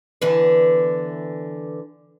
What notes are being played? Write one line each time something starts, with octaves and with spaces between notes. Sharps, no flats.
D3 E3 B3